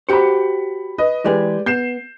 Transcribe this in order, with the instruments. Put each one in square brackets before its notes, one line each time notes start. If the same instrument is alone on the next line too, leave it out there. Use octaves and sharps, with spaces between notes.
[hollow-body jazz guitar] F#4 G4 C5 [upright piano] B5 C#7
[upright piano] B4 D#5
[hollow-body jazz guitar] E3 G#3 G#4 [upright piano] G4 B4 D5
[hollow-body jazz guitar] B3 [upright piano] G6 C7 E7